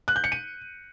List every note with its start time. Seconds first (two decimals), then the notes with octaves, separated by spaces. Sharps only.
0.08 F#6
0.16 G6
0.24 C#7
0.32 D#7